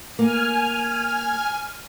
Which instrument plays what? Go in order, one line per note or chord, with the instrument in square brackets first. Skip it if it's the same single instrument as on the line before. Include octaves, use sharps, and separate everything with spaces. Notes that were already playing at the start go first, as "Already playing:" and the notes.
[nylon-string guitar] A#3 [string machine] G#5 F6